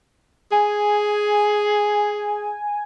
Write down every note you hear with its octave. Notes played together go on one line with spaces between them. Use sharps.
G#4 G#5